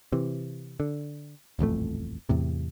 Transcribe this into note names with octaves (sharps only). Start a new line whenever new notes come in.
C3 E3
D3
D#1 A1 F2 A3
E2 A2 C3